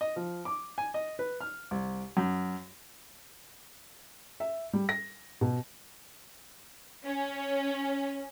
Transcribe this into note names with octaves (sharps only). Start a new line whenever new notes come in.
D#5
F3
D6
G#5
D#5
B4
F6
C2
F#2
E5
G3
A#6
B2
C#4